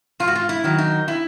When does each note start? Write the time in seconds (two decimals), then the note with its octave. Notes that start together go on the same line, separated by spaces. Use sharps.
0.20 G#2 F4
0.28 F#4
0.35 F4
0.49 E4
0.64 D#3 F#3
0.78 D#4
1.08 E4